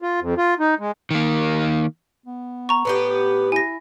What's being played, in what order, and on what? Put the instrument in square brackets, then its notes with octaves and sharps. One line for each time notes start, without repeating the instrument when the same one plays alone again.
[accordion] F4
F2
F4
D#4
G#3
[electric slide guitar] D#3 A#3
[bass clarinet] B3
[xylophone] A#5 C#6
[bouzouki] A2 B3 G4 [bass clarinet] B4
[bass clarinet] E4 [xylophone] G#5 A#6